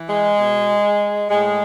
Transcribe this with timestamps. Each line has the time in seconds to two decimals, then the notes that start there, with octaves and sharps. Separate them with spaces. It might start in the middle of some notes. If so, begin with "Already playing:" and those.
Already playing: E3
0.09 G#3
0.38 B2
1.30 A2 G#3